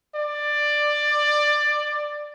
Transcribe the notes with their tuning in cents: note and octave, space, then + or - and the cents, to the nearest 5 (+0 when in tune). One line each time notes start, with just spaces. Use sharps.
D5 +15